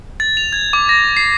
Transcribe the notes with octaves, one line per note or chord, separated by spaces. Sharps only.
A6
F7
G#6
D6
A#6
C7